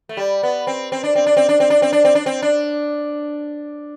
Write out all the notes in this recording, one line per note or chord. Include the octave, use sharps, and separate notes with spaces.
A3
G3
B3
C4
C4
D4
C4
D4
C4
D4
C4
D4
C4
D4
C4
D4
C4
D4